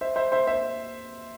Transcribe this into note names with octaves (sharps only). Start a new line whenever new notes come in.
C5 E5
C5 E5
C5 E5
C5 E5